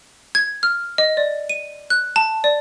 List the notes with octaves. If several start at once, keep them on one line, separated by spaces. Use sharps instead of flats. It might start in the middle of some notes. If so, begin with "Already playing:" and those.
G#6
F6
D#5
D5
D#7
F#6
A5
D5